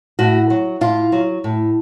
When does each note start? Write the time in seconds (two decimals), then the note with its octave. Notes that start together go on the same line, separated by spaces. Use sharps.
0.19 A2 F#4
0.50 F#3
0.81 A2 F4
1.12 F#3
1.44 A2